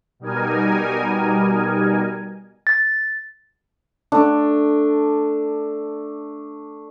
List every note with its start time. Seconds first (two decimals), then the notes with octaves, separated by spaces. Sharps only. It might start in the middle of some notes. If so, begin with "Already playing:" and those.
0.20 B2 G3 D#4 A#4 G#5
2.67 A6
4.12 A3 D4